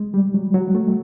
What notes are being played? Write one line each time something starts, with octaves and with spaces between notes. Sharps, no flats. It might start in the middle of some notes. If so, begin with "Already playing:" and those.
Already playing: G#3
G3
F#3
F#3
A3